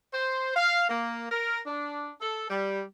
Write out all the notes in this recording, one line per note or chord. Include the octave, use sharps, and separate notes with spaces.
C5
F5
A#3
A#4
D4
A4
G3